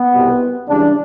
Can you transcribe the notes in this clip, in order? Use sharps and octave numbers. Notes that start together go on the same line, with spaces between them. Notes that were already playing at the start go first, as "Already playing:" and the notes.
Already playing: B3
C2 B2 G3
C#2 C#3 E3 G3 D4